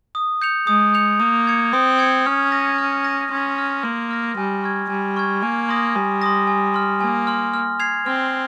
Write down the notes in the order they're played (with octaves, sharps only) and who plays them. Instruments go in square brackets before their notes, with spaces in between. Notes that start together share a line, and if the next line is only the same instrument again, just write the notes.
[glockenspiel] D#6
G6 C#7 F7
[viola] G#3 [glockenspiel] D#6
[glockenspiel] G6 C#7 F7
[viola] A#3 [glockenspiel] D#6
[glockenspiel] G#6 C#7
[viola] C4 [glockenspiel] D#6
[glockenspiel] G#6 C#7
[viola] C#4 [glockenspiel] F6
[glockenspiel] A#6 D#7
F6
A#6 D#7
[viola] C#4 [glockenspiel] C6
[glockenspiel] F6 A#6
[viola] A#3 [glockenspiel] C6
[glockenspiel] F6 A#6
[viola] G3 [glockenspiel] G#5
[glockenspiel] C#6 F6 G#6
[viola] G3 [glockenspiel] G#5
[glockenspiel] C#6 F6 G#6
[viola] A#3 [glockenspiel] G#5
[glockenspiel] C6 D#6 A#6
[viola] G3 [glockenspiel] G#5
[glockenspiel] C6 D#6 A#6
G#5
C6 F6
[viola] A#3 [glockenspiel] G#5
[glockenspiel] C6 F6
F6
G#6 C7 F7
[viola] C4 [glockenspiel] F6